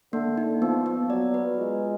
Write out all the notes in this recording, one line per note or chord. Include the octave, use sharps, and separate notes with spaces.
D3 A#3
D#4
F3 B3
B3
F#3 D5
B4
G#3 F4